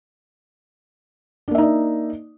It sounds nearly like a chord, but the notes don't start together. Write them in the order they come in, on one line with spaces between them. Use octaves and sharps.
D4 A#3 E5 D#4 D5